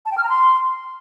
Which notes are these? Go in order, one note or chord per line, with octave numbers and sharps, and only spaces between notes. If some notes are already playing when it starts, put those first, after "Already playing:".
A5
G5
F6
A#5
C6